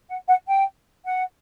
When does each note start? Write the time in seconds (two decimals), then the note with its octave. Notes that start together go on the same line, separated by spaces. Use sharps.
0.09 F#5
0.28 F#5
0.47 G5
1.05 F#5